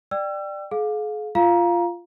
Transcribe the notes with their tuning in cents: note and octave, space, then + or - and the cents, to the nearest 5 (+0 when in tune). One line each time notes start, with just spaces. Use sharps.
D5 +15 G5 +0 E6 +40
G#4 +40 F5 +25
F4 -10 F5 +0 A#5 +20